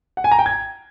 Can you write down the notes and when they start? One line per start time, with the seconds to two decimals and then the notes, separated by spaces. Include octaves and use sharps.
0.17 F#5
0.24 G#5
0.32 A#5
0.39 G5
0.46 G#6